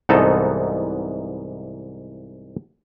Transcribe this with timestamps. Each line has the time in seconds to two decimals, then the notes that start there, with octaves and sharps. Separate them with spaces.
0.09 C2 G#2 E3 B3 D#4 A4